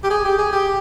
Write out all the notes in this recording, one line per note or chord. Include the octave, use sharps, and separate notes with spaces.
G4
G#4
G4
G#4
G4